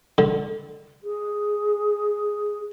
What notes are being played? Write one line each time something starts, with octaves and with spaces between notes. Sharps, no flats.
D3
G#4